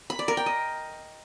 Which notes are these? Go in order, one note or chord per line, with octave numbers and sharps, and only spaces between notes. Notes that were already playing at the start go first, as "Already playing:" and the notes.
B5
D5
A#4
G5
D#5